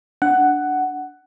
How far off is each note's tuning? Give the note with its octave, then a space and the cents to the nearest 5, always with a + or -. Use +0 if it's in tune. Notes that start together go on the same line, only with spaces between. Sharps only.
D4 +0 F#5 +10